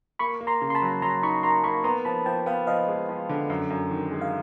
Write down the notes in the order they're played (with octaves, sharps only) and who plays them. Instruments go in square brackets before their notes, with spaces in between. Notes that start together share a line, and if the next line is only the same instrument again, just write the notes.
[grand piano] A#3 [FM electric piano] B5 C#6
[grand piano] A#3
[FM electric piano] A#5 C6
[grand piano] C#3
[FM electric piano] C6
A5 B5
[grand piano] F#3
[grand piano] F#3 [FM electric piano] A#5 C6
[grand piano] D#4 [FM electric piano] B5 C#6
[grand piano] A#3 [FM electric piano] A#5 C6
[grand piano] A#3 [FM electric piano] B5 C#6
[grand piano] B3 [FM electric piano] A#5 C6
[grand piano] F3 [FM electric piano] A5 B5
[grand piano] F3 [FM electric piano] G5 A5
[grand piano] B3 [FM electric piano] F5 G5
[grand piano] F3 [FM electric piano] D#5 F5
[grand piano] G#3
F3
D3
F#2
F#2
D#3
G#3
[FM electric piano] F5